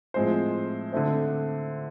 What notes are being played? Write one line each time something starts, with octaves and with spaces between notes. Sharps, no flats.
A2 F3 G#3 C4 C5
D3 A3 C4